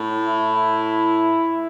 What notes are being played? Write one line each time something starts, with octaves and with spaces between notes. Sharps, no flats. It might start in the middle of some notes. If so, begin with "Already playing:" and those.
Already playing: A2
E4